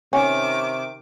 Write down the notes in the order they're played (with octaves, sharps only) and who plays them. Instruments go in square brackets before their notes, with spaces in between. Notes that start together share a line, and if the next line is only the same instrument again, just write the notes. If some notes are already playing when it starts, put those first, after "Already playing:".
[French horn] C3 [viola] D#3 D6 [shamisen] C#4